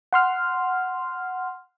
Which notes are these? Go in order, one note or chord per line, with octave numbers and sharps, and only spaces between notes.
F#5 C6 F6